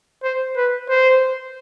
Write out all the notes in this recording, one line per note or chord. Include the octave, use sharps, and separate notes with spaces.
C5
B4
C5